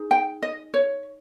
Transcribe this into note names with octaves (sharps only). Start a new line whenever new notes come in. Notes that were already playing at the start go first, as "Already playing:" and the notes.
Already playing: D#4 G#4
G5
D#5
C#5